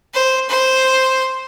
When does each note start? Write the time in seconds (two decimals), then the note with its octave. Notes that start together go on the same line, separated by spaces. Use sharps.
0.14 C5
0.49 C5